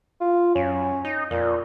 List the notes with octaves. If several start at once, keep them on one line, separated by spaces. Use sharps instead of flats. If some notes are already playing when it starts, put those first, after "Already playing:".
F4
F#2 C#4
D#4
F2 A#2